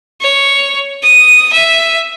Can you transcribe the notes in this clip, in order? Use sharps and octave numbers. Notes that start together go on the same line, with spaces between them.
C#5
D#6
E5